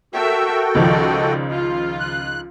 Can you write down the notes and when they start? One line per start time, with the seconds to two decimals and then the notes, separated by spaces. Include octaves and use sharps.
0.14 F#4 A4 A#4 E5 G5
0.75 C#2 D#3 F3 D5 D#5
1.52 F4
2.00 F#6